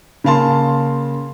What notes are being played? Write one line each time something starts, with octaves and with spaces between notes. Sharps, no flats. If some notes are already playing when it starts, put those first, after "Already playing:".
C#3 A#3 F5 A5 C6